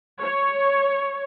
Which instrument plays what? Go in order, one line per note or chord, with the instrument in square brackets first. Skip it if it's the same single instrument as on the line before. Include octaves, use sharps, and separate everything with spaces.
[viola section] C#5